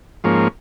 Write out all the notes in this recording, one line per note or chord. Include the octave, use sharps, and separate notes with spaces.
G#2 F3 A#3 C#4